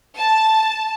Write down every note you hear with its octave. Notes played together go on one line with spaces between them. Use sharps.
A5